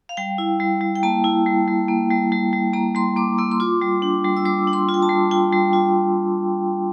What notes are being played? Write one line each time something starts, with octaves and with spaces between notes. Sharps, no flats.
F5
G3 G5
E4
G3
G3
G5
A#3 A5
E4
G3
G3
A#3
G3
G3
G3
A#3 A#5
G3 C6
A#3 D6
A#3 E6
C6
F4 D6
G3
D4
G3
E6
G3 D6
D4
C6
F4
G5
A5
G3
F4 G5
G3
F4